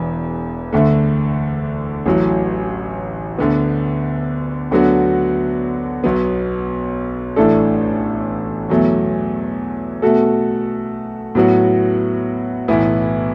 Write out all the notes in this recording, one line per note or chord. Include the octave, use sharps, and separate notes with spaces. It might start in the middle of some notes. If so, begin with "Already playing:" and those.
Already playing: E1 E2 B2
D2 D3 A3
A1 A2 F#3
D2 D3 B3
D2 D3 F#3 B3 F#4
B1 B2 F#3 B3
A1 A2 A3 D4 A4
E2 B2 F#3 A3
B2 A3 F#4 A4
A2 F#3 B3 F#4
B1 A2 E3 B3 E4